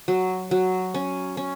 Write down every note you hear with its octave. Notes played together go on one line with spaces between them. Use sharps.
F#3
F#3
C#4
C#4